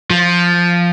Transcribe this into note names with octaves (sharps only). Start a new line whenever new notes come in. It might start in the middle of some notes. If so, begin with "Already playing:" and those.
F3